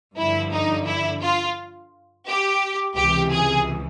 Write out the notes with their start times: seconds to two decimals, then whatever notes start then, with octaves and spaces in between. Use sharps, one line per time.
0.17 G2 D3 F3 E4
0.52 D#4
0.86 E4
1.21 F4
2.27 G4
2.96 C#2 C3 E3 G4
3.32 G#4